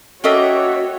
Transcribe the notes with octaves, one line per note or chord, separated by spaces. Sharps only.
A#3 C#4 F#4 G4 A4 C#5 D#5 E5